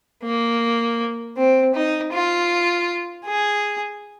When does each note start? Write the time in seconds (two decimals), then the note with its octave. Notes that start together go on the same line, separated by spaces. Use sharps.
0.24 A#3
1.37 C4
1.74 D#4
2.13 F4
3.26 G#4